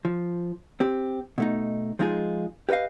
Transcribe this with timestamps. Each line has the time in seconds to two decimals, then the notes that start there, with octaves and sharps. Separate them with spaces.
0.05 F3
0.80 C4 G4
1.38 B2 A3 D#4
1.99 F3 G#3 D#4 F4 G#4
2.69 G4 B4 C#5 D#5 F5